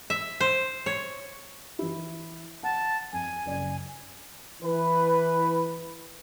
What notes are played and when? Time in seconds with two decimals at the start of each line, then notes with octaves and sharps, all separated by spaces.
0.10 E5
0.40 C5
0.86 C#5
1.79 E3 E4
2.63 F#5 A5
3.13 F2 G#5
3.46 F#1 D5
4.62 E3 B4